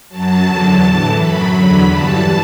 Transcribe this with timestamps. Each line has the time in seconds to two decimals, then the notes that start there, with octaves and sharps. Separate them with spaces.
0.09 F#2 F#3 A5
0.45 E2 D3 F#3
0.82 A2 E3
1.17 F#2 F#3 B5
1.53 E2 D3 F#3 B5
1.89 G2 E3 A5